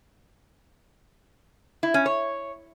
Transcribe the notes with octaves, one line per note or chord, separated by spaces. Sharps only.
E4
C#4
C#5